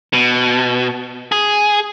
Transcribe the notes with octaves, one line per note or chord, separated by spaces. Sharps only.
B2
G#4